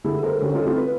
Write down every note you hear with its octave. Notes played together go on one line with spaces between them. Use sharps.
D3 G3 B3 E4 G#4
G4 A4 A#4 C5
D3 G3 C#4 F#4 G4 A4
C#4 D#4 F4 A4
A3 C4 E4 F4 A4
B4